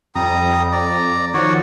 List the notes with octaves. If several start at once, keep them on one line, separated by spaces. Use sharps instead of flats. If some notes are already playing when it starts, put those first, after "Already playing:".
F2 G3 A#5 D#6
D5 A#5
D#3 F3 F#4 C#5 D5